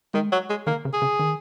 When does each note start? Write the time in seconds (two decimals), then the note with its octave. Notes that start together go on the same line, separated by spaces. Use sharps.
0.14 D#3 G#3
0.32 F#3
0.49 G#3
0.67 D#3 A#3
0.85 C#3
0.93 G#4
1.02 C#3
1.19 D#3